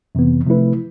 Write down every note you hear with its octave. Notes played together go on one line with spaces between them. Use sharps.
F2 C3 E3 B3
C3 F3 A3 E4 B4